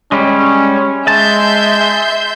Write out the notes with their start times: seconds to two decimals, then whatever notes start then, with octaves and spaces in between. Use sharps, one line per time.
0.12 G3 G#3 C#4
1.08 G#3 E5 A5 C6 G6